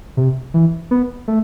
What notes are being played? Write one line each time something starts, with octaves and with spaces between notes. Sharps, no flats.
C3
E3
B3
A3